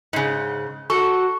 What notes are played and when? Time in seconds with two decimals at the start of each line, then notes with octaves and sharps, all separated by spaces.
0.13 G#2 C#3
0.90 F#4 A4 C#6